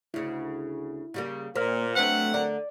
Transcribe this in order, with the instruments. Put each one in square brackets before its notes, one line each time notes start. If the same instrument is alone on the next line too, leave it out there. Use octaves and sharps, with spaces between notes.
[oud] D2 C#3 [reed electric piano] E4
[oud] C#3 G3 A#3
[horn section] A#2 [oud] A#3 [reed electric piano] C5 F6
[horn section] F#3 C4 F#5 [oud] A3 D4 B4
[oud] D3 A#4 [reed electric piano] D5